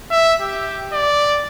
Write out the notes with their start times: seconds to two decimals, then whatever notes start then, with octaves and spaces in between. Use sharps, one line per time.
0.11 E5
0.41 G4
0.93 D5